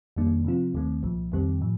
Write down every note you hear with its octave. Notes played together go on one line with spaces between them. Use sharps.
F2 D#3 G3 A#3 D4
C3 F3 C4 F4
D#2 D#3 A3 C4
C2 A#2 F3
F2 D#3 G3 C4 G4
A2 F3